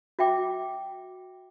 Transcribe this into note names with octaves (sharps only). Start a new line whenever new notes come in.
F#4 E5 G5 D6